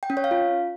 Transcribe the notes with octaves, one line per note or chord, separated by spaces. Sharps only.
G5
C#4
C#5
F5
F4